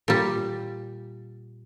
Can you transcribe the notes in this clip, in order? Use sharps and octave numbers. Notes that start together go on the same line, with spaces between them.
A#2 G3